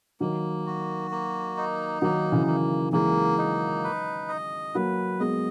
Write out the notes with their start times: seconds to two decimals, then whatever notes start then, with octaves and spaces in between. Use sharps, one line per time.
0.20 D#3 F#3 A#3
0.66 F#4
1.11 A#3
1.57 D#4
2.02 D#3 F#3 A#3
2.32 C#3 E3
2.47 A#3
2.93 E3 G#3 A#3
3.38 D#4
3.84 B4
4.29 D#5
4.75 F#3 A#3 B4
5.20 G#3 B3 D#5